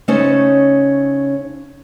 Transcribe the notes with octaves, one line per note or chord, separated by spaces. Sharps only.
C#3 A3 C#4 D#4 C5 C#5